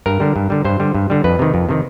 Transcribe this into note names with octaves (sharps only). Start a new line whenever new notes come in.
G2 A#4
D3 G3
G2
D3 G3
G2 C5
D3 G3
G2
D3 G3
F2 B4
C3 D#3
F2
C3 D#3